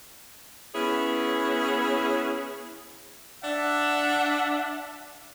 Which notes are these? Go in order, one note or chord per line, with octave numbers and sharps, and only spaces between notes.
B3 C#4 E4 G#4 C#5
D4 D5 E5 F#5